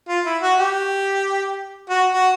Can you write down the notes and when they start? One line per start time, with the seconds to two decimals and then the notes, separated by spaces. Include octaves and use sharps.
0.08 F4
0.25 E4
0.42 F#4
0.58 G4
1.89 F#4
2.12 F#4